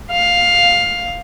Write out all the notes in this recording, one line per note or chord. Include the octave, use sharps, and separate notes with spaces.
F5